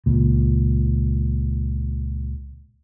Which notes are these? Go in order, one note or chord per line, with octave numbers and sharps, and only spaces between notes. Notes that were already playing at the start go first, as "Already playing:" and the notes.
C#2 A#2